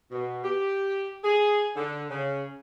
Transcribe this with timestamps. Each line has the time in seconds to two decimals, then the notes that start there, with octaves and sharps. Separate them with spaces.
0.11 B2
0.43 G4
1.23 G#4
1.75 D3
2.09 C#3